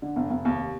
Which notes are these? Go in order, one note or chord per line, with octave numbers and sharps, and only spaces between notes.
D3
F1
F1
D#2
C3